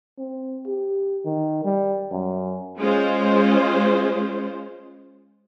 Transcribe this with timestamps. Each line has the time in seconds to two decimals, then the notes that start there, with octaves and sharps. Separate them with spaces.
0.18 C4
0.67 G4
1.25 D#3
1.64 G3
2.11 F#2
2.78 G#3 C#4 F4 C5